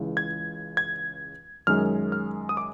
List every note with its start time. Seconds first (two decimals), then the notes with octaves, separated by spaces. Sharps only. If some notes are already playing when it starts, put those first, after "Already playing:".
Already playing: C#2 C#3 E3
0.17 G#6
0.77 G#6
1.67 F#2 D#3 G#3 F6
2.12 F6
2.49 D#6
2.57 D6